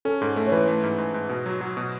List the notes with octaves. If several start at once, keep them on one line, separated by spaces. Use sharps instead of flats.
C#4 A4
G#2 A4
A3 A4
C#5
E3 B4
A3
G#2
G#2
G#2
B2
F#3
F#3
B2